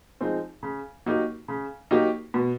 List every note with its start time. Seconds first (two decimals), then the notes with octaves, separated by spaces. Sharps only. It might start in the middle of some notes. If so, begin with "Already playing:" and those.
0.21 F3 G#3 C4 D#4
0.63 C#3
1.06 F#3 A#3 D#4 G4
1.48 C#3
1.91 F#3 A#3 D#4 G4
2.34 B2